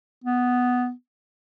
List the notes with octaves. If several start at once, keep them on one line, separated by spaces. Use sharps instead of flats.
B3